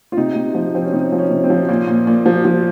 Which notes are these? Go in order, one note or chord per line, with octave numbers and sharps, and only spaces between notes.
F4
C3 D#4
C3
F3
F3 C4
C#4
C3 D#4
F3
C#4
C3
C4
F3
A#2 A#3
A#2
A#2
F3
F3